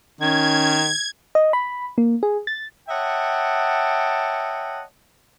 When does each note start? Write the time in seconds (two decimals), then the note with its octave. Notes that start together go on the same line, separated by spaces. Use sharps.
0.21 D#3 C#4 G#6
1.35 D#5
1.53 B5
1.98 A#3
2.23 G#4
2.47 A6
2.89 C#5 D#5 E5 F#5 G5 A5